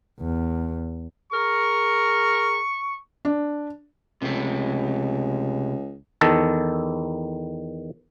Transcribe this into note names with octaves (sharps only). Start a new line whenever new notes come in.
E2
G#4 A#4 C#6
D4
C#2 C3 A3
E2 D#3 A4 A5